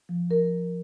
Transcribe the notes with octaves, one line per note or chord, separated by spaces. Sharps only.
F3
A#4